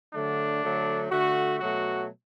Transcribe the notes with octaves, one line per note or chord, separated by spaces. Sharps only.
D3 F#3 A3 D4
D3 F#3 A3
D3 A3 F#4
B2 F#3 A3 F#4